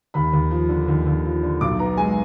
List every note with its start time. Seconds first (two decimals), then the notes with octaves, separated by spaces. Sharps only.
0.14 D#2 B5
0.33 D#2
0.51 F3
0.69 D3
0.88 D#2
1.07 D#2
1.25 F3
1.43 D3
1.61 B1 D6
1.79 B3 A#5
1.97 G#3 G#5